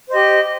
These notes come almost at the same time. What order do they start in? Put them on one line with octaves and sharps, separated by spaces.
C5 D#5 G4